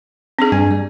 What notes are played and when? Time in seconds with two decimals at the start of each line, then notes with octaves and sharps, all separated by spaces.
0.39 C4 D4 G#4
0.52 G2 G#5
0.71 G3